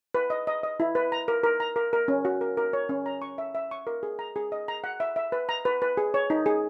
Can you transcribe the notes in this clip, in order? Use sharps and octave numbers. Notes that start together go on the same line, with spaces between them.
B4
D#5
D#5
D#5
E4
B4
A#5
A#4
A#4
A#5
A#4
A#4
C#4
F#4
A#4
A#4
C#5
C#4
A#5
C#6
E5
E5
C#6
A#4
G#4
A#5
G#4
D#5
A#5
F#5
E5
E5
B4
A#5
B4
B4
G#4
C#5
D#4
G#4